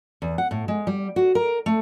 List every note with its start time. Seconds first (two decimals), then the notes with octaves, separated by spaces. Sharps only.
0.22 E2
0.38 F#5
0.51 A2
0.68 G#3
0.87 G3
1.16 F#4
1.35 A#4
1.66 A3